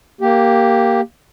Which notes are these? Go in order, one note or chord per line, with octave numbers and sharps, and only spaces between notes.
A#3 G4